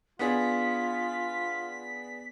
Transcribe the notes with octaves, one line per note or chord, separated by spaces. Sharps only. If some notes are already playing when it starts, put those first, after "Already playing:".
B3 D4 F4 G#4 B6